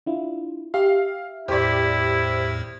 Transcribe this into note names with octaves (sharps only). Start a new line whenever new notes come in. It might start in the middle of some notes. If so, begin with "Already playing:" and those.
D4 E4 F4
G4 E5 F5
E2 A2 E4 G4 C5 D5